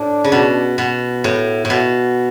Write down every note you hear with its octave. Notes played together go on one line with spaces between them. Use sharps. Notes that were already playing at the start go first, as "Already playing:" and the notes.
Already playing: A2 D4
C#3
B2
B2
A2 E4
A2
B2